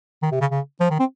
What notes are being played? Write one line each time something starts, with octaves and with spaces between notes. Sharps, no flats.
D#3
C3
C#3
C#3
F3
D#3
C4